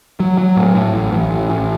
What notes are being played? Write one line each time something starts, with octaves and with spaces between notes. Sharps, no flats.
F#3
F#3
A2
A2
A1
A1
A1
A1